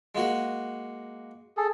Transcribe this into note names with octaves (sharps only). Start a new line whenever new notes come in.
G#3 A#3 F#4
G#4 A4